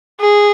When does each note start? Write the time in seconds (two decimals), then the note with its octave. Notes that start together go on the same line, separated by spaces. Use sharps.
0.20 G#4